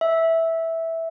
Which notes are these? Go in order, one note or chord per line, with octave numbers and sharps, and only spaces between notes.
E5